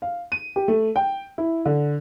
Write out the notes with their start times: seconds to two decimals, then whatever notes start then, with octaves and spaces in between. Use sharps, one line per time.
0.02 F5
0.32 D#7
0.56 G4
0.68 A3
0.96 G5
1.38 E4
1.65 D3